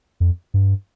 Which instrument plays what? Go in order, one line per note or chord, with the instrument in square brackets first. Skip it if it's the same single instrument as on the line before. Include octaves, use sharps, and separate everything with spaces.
[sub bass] F2
G2